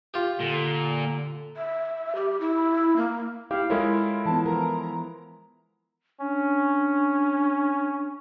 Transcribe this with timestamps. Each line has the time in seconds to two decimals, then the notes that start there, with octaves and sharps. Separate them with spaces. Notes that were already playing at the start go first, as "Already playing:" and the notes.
0.14 F4 G4
0.40 A#2 D3
1.57 E5
2.15 G4
2.41 E4
2.97 A#3
3.51 E4 G4 F5
3.70 G#3 E4 F4 A4 A#4 C#5
4.25 E3 B3 A5
4.46 F3 A#4 A#5
6.21 C#4 D4